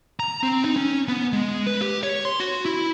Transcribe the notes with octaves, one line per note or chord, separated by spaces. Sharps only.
A#5
C4
D#4
C#4
B3
G#3
B4
G4
C#5
C6
F#4
E4